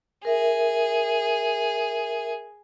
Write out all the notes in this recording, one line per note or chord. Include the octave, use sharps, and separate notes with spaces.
G#4 A#4 E5